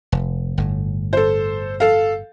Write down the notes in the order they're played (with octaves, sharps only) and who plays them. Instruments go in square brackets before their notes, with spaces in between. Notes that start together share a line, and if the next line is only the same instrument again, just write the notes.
[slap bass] F1
G1 A2
[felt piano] A4 C5
A4 F5